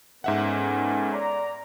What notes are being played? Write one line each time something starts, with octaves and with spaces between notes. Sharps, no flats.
G#2 B3 C#4 A4 E5 F#5
D5 A#5